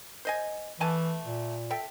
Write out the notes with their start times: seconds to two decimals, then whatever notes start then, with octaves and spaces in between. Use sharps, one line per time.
0.25 C5 D#5 G#5
0.80 E3 A3 G#5 A5
1.25 A#2
1.70 A4 E5 G5